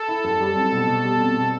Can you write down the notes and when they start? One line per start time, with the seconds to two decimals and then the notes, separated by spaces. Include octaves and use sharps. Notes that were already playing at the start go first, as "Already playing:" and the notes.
Already playing: A4
0.08 E4
0.24 F#2
0.40 G3
0.56 C4
0.72 B2
0.88 B2
1.04 G3
1.20 C4
1.36 B2